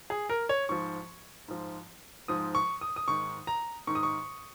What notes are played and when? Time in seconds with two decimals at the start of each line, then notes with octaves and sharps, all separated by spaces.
0.10 G#4
0.30 A#4
0.49 C#5
0.69 G#2 F3 C#6
1.48 G#2 F3
2.28 G#2 F3 D#6
2.55 C#6
2.81 D#6
2.96 D#6
3.08 G#2 D#3 C#6
3.47 A#5
3.87 G#2 D#3 C#6
3.95 D#6
4.03 C#6